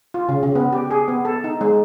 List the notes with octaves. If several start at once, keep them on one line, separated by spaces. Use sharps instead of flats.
F4
C#3
C#3
B3
G4
G#4
B3
A4
D#4
G#3